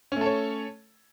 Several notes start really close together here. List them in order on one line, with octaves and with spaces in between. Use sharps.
C#4 A3 A4 C#5